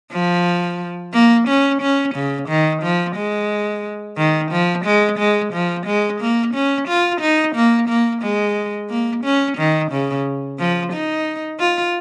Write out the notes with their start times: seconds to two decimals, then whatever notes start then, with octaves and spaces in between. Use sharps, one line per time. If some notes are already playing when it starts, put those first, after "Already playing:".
0.12 F3
1.13 A#3
1.48 C#4
1.82 C#4
2.15 C#3
2.49 D#3
2.83 F3
3.16 G#3
4.18 D#3
4.52 F3
4.85 G#3
5.19 G#3
5.53 F3
5.86 G#3
6.21 A#3
6.55 C#4
6.88 F4
7.21 D#4
7.56 A#3
7.89 A#3
8.23 G#3
8.90 A#3
9.25 C#4
9.58 D#3
9.92 C#3
10.59 F3
10.93 D#4
11.60 F4